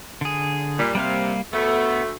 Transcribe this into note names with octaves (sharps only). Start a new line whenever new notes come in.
D3 G#4
A#2 G3
C3 G3 A#3 F5
D2 A3 B3